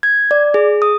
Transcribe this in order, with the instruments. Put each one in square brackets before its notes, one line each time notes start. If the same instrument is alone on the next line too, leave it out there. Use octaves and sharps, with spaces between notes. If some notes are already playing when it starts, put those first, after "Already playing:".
[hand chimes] G#6
D5
G#4
D#6